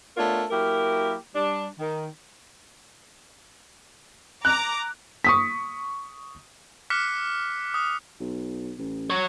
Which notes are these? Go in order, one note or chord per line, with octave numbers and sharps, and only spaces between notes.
A3 B3 D4 F4 A#4 C#5
F#3 A#3 E4 G4 A#4
G3 D4
D#3
A#5 D6 F#6
C#6 D#6 B6
D6 F6 F#6 B6 C#7
D#6 F#6
B1
A1
F#3 C#5